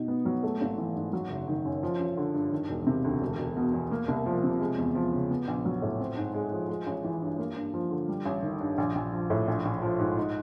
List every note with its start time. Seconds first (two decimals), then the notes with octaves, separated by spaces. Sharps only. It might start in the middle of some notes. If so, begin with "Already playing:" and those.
Already playing: B2 D#4
0.08 B3
0.25 F#3
0.43 A3
0.61 G#1
0.78 E3
0.96 G#2
1.13 F#3
1.30 F#1
1.48 D#3
1.65 F#2
1.83 F3
1.99 A1
2.17 D3
2.34 G2
2.52 D#3
2.69 E1
2.87 C3
3.04 D2
3.21 E1
3.39 E1
3.57 B2
3.73 E2
3.91 A#3
4.08 C2
4.26 F3
4.44 C3
4.60 G#3
4.78 E2
4.95 F3
5.13 C#3
5.30 B3
5.48 A#1
5.65 F#3
5.82 A2
6.00 C4
6.17 G#2
6.34 G#3
6.52 F3
6.69 G#3
6.87 A1
7.04 E3
7.22 G2
7.39 A#3
7.56 G2
7.74 F3
7.91 D3
8.08 G3
8.25 A1
8.43 D#3
8.60 G2
8.78 A#1
8.95 A#1
9.12 F3
9.30 A2
9.48 A#1
9.65 A#1
9.82 F3
9.99 G#2
10.18 D#4